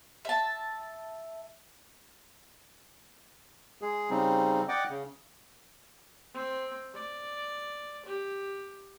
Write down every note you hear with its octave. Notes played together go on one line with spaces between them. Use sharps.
E5 A5
G#3 G#4
C#3 G3 C4 D#4
D5 D#5 F#5 G5 D6
C#3
C4
D5
G4